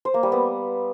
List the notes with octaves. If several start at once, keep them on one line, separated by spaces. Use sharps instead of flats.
C5
A#3
G3
B3